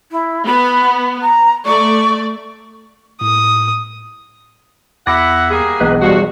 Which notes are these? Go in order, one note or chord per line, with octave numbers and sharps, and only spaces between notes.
E4
B3 B5
A#5
A3 D5 C#6
A2 D#6
E2 E4 F#5 D6 A#6
G3 A#3 G#4
E1 B1 E2 B4 D#5
G2 F3 G3 F#4